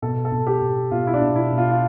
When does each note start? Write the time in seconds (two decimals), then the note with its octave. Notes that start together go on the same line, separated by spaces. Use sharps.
0.02 B2 A4
0.25 A4
0.32 B2
0.47 G4
0.62 B2
0.91 B2 F4
1.07 E4
1.14 D4
1.22 B2
1.35 E4
1.52 B2
1.58 F4
1.71 F4